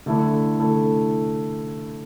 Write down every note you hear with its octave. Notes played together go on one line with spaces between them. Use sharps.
D3 A3 E4 A4
D3 A3 E4 A4